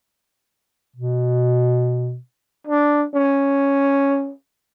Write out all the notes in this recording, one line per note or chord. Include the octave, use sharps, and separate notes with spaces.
B2
D4
C#4